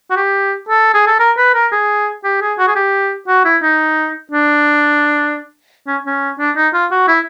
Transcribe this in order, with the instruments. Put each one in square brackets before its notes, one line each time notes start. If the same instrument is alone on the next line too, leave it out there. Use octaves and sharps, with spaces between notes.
[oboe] F#4
G4
A4
G#4
A4
A#4
B4
A#4
G#4
G4
G#4
F#4
G#4
G4
F#4
E4
D#4
D4
C#4
C#4
D4
D#4
F4
F#4
E4